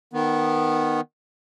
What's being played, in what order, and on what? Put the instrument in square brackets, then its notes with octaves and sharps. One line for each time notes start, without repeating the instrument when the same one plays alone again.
[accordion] D#3 B3